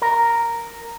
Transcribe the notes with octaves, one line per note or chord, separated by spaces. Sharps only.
A#4